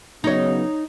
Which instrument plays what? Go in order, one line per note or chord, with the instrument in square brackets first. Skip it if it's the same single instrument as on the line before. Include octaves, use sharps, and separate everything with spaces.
[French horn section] C#3 F#3 B3 [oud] D#4 C#5